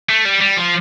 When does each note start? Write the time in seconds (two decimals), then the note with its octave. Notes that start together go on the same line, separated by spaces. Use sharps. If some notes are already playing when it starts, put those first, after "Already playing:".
0.09 A3
0.25 G3
0.41 G3
0.57 F3